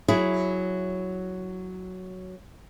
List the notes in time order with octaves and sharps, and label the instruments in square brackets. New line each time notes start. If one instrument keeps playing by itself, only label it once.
[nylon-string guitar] F#3 E4 G#4